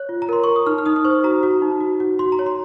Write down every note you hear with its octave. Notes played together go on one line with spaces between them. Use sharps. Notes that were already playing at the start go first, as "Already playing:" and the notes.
Already playing: C#5 F#6
F4
A#5
A#4 C6
A#4 C#6
D#6
D#4 F6
F6
D#4 D#6
D#6
C5 C#6
F#4 A#5
F#4
D#4
F#4
F#4
F#4 C6
A#5
C#5
C6